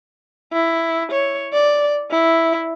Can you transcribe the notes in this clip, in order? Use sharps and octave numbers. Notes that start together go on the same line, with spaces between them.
E4
C#5
D5
E4